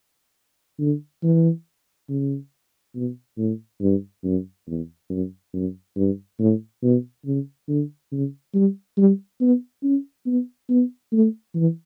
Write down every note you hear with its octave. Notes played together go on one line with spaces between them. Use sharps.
D3
E3
C#3
B2
A2
G2
F#2
E2
F#2
F#2
G2
A2
B2
C#3
D3
C#3
G3
G3
B3
C#4
B3
B3
A3
E3